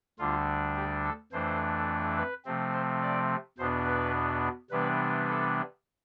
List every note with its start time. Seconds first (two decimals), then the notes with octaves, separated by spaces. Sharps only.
0.19 D2 D3 G3 D4 F4
0.76 G4
1.04 A4
1.32 F2 E3 A3 D4 C5
2.17 B4
2.45 C3 F3 A3 C4
2.73 C5
3.02 D5
3.58 E2 B2 B3 D4 C5
3.86 B4
4.71 C3 E3 G3 B3 D4 B4
5.28 A4